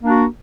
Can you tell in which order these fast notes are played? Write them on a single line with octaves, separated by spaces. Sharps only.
A#3 D4 F#4